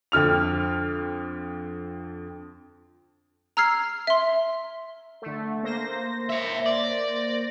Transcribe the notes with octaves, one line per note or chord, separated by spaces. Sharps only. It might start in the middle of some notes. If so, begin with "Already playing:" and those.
F2 D3 F6 F7
A#5 E6 F6 G#6 C7
E5 C6
D3 A3
A#3 C5 A#6
C#5 E5
D5